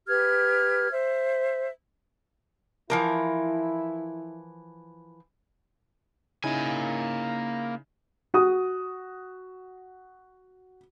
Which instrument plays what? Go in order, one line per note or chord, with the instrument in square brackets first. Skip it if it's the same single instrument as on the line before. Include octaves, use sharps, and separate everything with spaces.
[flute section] G4 B4 F6 G#6
C5 E5
[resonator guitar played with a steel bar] E3 F3 A#4 [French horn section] E4
[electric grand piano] C#3 D#4 E4 [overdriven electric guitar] A#3 G#5
[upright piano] F#4 D#6